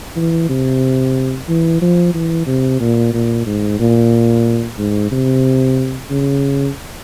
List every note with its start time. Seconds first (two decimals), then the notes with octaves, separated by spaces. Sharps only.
0.16 E3
0.49 C3
1.49 E3
1.82 F3
2.14 E3
2.47 C3
2.81 A#2
3.13 A#2
3.46 G#2
3.79 A#2
4.78 G#2
5.12 C3
6.11 C#3